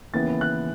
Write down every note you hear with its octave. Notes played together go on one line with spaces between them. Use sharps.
D#2 C#3 E3 B3 A6
F#6